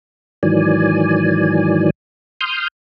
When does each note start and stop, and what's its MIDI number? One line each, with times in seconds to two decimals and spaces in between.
0.43 1.90 44
0.43 1.90 51
0.43 1.90 52
0.43 1.90 54
0.43 1.90 74
0.43 1.90 80
2.41 2.68 84
2.41 2.68 87
2.41 2.68 89
2.41 2.68 91